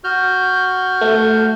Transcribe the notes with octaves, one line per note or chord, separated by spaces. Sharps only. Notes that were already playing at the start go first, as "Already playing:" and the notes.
F#4 F6 G6
A3